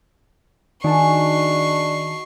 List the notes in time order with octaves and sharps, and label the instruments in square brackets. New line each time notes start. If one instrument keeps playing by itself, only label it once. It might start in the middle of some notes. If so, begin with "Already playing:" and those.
[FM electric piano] D#3 A5 [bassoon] D4 [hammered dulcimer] D#4 F#4 G#4 [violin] C#6 C7